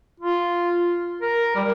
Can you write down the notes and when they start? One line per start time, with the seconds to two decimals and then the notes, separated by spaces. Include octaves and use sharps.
0.20 F4
1.22 A#4
1.56 G3